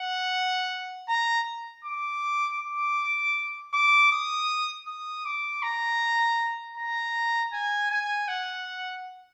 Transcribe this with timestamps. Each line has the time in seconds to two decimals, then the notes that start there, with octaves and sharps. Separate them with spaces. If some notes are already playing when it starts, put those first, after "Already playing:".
Already playing: F#5
1.09 A#5
1.84 D6
2.59 D6
3.74 D6
4.12 D#6
4.88 D#6
5.25 D6
5.63 A#5
6.77 A#5
7.53 G#5
7.91 G#5
8.28 F#5